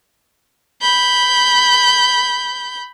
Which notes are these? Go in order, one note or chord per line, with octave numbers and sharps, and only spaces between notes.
B5 G6